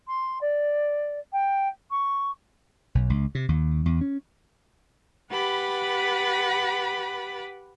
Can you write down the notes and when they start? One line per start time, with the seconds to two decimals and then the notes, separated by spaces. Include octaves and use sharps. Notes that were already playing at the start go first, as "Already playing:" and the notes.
0.07 C6
0.41 D5
1.32 G5
1.90 C#6
2.95 B1
3.10 C#2
3.35 C3
3.49 D#2
3.86 E2
4.01 C#4
5.31 G4 B4 F#5 B5 A6